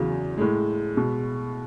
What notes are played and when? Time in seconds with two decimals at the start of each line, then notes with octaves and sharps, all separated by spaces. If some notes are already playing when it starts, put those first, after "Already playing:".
Already playing: E2 C#3 F#3
0.38 A2 G#3
0.96 B2 G#3